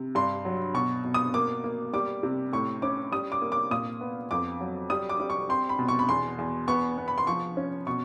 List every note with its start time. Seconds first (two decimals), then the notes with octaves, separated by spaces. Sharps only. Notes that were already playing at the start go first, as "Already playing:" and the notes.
Already playing: C3
0.15 G2 C6
0.45 F#3
0.74 B2 C#6
1.04 B2
1.14 D#6
1.34 A#3 D6
1.64 A#3
1.93 G3 D6
2.23 C3
2.53 A2 C#6
2.82 C#4 D6
3.12 G3 D#6
3.32 D6
3.42 A#3
3.52 D6
3.71 A#2 D#6
4.01 B3
4.31 F2 D6
4.60 F#3
4.90 G3 D#6
5.09 D6
5.20 G3
5.30 C#6
5.49 C4 C6
5.69 B5
5.79 B2
5.88 C#6
5.99 B5
6.09 E2 C6
6.38 E2
6.68 B3 C#6
6.98 B3
7.08 B5
7.18 C6
7.27 F3 C#6
7.57 C#4
7.87 B2 C#6